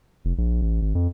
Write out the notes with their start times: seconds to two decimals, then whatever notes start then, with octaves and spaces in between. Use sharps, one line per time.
0.25 F1
0.38 A#1
0.62 A1
0.82 G#1
0.95 F2